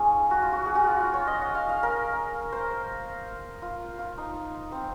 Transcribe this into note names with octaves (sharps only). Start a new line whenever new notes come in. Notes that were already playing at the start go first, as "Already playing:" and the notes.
Already playing: C#4 D#4 F4 G#4
F#4
F4
F#4
G#4
F#4
F4
F4
C#5
D#5
F#5
F5
F5
A#4
C5
F4
F4
D#4
C4